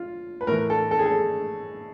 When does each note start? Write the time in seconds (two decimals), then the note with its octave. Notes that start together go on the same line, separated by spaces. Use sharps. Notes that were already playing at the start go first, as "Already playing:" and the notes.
Already playing: F4
0.41 B4
0.47 A2 E3 A#4
0.70 A4
0.91 A4
0.99 G#4
1.06 A4